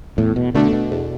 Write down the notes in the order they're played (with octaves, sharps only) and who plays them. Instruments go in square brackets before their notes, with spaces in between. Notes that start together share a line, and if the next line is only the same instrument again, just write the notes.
[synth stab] E2 [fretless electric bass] A2
[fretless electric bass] B2
[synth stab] B2 A3 D4 [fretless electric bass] D3
[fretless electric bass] B2
[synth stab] E2